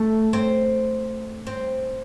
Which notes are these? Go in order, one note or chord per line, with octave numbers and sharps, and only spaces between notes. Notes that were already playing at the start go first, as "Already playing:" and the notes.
Already playing: A3
C4
C4